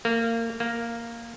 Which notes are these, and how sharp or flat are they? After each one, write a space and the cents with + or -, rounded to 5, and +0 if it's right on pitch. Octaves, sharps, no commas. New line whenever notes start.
A#3 -25
A#3 -5